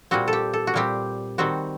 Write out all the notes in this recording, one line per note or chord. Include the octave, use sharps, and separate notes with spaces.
A#2 G3 C4 F#4
A4
G4
A4
F#4
A#2 G3 C4 G4
D#3 G3 C4 F#4